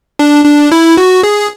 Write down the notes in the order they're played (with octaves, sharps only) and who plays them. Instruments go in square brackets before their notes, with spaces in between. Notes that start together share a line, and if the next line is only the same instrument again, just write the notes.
[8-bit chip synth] D4
D4
E4
F#4
G#4